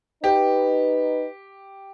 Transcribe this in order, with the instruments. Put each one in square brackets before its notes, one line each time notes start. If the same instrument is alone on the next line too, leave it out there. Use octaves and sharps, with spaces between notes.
[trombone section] D#4 B4 [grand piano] G4